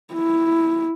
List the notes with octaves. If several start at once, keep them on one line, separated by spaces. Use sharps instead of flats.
E4